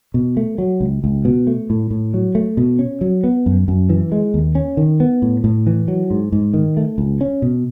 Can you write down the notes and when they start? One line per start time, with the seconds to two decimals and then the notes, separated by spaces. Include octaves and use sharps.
0.14 B2
0.37 A3
0.58 F#3
0.80 C#2
1.04 C#2
1.25 B2
1.47 A3
1.70 A2
1.91 A2
2.14 F#3
2.35 A3
2.57 B2
2.79 C#4
3.01 F#3
3.24 B3
3.46 F#2
3.68 F#2
3.89 E3
4.12 G#3
4.34 D#2
4.55 C#4
4.77 D#3
5.00 B3
5.22 A2
5.44 A2
5.67 E3
5.88 F#3
6.10 G#2
6.32 G#2
6.54 D#3
6.77 A3
6.98 C#2
7.21 C#4
7.42 B2